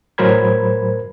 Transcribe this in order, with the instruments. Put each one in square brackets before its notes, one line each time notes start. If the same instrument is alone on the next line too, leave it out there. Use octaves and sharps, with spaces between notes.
[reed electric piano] A2 F#3 A#4 C5 B5 G#6